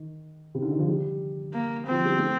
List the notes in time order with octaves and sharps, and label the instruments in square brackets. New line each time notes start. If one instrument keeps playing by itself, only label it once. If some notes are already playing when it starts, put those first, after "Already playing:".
Already playing: [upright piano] D#3
C3
D3
D#3
F3
G3
[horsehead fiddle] A#3
[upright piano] F3 [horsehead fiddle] C4
[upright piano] G3
A3